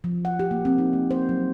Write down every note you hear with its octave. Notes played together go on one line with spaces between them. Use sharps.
F3
F#5
G4
A#3
C4
D#4
A#3
C5
F#3